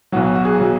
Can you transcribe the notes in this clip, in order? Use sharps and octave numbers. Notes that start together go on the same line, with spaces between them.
B1 B2 F#3 F#4
F#4
G#4
B2 F#3